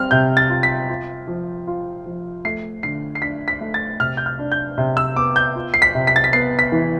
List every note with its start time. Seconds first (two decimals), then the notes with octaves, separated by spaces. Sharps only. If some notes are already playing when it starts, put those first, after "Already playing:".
Already playing: G3 C4 F6
0.11 C3 G6
0.37 A6
0.50 F4
0.63 B6
0.89 F4
1.28 F3
1.67 F4
2.06 F3
2.45 A3 C7
2.83 D3 C7
3.15 C7
3.22 D4 B6
3.48 B6
3.61 A3
3.74 A6
4.00 C3 F6
4.17 G6
4.26 F6
4.39 D4
4.52 G6
4.78 C3
4.97 E6
5.16 B3 D6
5.36 G6
5.55 F4
5.74 C7
5.82 B6
5.95 C3
6.07 B6
6.16 A6
6.24 B6
6.33 B3 C7
6.59 B6
6.72 E3